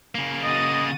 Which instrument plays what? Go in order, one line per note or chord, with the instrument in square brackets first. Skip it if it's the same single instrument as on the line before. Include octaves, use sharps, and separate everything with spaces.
[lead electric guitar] C#3 A#3
[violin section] F#4 D#6 A6 [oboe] D#5